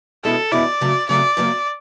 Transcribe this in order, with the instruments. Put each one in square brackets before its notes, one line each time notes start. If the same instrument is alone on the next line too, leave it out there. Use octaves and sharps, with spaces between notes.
[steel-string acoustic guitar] E2 B2 G#3 C#4 E4 [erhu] A4
[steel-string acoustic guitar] E2 B2 G#3 C#4 E4 [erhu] D5
[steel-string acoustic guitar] F2 C#3 F#3 A3
[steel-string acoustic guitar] F2 C#3 F#3 A3 [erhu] D5
[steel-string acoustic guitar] F#2 C#3 F#3 A#3